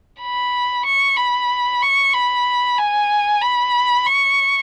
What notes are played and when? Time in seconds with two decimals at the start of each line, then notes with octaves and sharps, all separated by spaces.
0.21 B5
0.85 C#6
1.17 B5
1.82 C#6
2.13 B5
2.78 G#5
3.41 B5
4.06 C#6